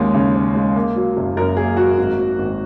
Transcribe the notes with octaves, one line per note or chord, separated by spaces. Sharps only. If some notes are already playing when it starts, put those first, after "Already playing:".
Already playing: D#2 G#3 C#4
C#3
C#4
G#3
A#3
F#3
F#1
F#2 A#4
A#3 G#4
F#3 F#4
G#1
F#3
G#1